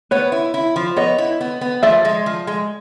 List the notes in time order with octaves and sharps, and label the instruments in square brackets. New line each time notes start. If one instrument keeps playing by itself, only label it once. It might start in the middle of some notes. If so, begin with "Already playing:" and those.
[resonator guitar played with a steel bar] B3 [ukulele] B4 C#5
[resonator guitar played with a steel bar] E4
E4
F3
[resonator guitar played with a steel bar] B3 [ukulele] C#5 D#5
[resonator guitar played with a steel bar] E4
B3
B3
[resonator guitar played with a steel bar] F3 [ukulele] D5 E5
[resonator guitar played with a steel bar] G#3
F3
G#3